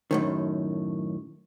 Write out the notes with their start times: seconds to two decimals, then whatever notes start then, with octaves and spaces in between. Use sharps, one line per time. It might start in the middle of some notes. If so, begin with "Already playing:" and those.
0.11 F#2 A2 D#3